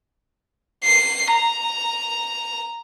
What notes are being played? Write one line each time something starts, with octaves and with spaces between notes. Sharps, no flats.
C7
A#5